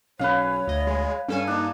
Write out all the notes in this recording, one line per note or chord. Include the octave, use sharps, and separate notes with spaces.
B1 C#4 B4 C#5 F5
D2 D#5
G#3
G2 C#4 A4 F5 G#5
A#3 D4 D#4 A5